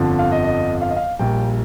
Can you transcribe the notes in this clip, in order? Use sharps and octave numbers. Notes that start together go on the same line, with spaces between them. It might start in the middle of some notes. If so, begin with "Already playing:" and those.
Already playing: G1 F2 D3 F3
F5
D#5
D#5
F5
D#5
F5
A#1 A#2 G3 G5